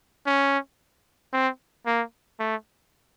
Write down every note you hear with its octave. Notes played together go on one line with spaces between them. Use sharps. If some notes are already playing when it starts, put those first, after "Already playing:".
C#4
C4
A#3
A3